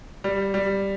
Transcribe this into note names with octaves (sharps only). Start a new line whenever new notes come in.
G3
G3